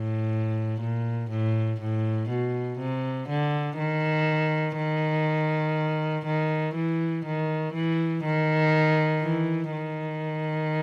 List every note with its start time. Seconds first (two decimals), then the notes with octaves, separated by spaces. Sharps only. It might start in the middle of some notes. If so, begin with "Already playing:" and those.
Already playing: A2
0.81 A#2
1.30 A2
1.80 A2
2.29 B2
2.78 C3
3.29 D3
3.78 D#3
4.77 D#3
6.26 D#3
6.74 E3
7.25 D#3
7.73 E3
8.24 D#3
9.22 E3
9.71 D#3